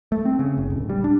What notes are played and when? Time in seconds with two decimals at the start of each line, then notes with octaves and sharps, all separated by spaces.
0.12 A3
0.25 C4
0.39 C#3
0.57 F#1
0.70 D1
0.89 G3
1.04 D4